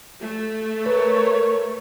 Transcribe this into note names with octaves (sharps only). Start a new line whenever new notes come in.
A3
A#4 B4 C#5